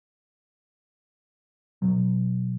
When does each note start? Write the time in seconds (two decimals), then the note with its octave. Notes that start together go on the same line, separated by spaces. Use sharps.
1.82 B2 F#3